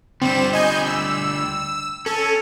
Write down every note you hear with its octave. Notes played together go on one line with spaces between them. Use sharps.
D2 G3 C4 E7
D#5 G#5 G6
E6
C#4 A4